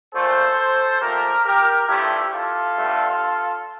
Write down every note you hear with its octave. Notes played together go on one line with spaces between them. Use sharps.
A#2 A3 A4 C5
A#2 F3 A3 G4 A#4
G4 A#4
G2 F3 A3 E4 G4
F4 A4
G2 D3 A3